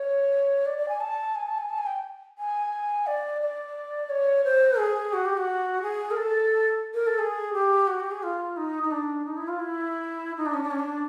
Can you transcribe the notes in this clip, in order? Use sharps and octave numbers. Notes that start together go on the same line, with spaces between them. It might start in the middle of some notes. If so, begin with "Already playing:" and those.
Already playing: C#5
D5
D5
G#5
A5
G#5
A5
G#5
A5
G#5
G5
G#5
D5
D5
C#5
C5
G#4
F#4
G4
F#4
G#4
A#4
A4
A#4
A4
G#4
G4
F#4
G4
G#4
F4
D#4
D#4
D4
D#4
E4
F4
E4
D#4
D4
C#4
D4
C#4
D4